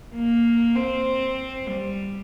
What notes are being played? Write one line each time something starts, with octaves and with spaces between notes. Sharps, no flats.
A#3
C4
G3